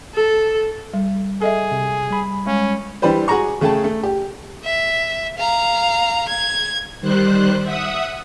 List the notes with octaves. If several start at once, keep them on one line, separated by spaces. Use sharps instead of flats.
A4
G3
G#4 A4 D#5 E5
C3
G3 B5
G#3 C#4
E3 G3 D4 G4 B4 C5
F#4 G#4 G#5 A#5 C#6
C#3 A3 G#4 G5 A5
A3
G4
E5
F5 A#5
G#6
D#3 G3 C5 F#6
E5 F#5 D#6